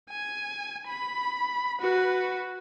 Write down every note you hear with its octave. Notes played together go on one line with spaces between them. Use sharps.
G#5
B5
F#4 B4